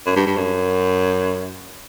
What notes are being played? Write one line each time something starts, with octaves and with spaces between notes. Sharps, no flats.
F#2
G2
G2
F#2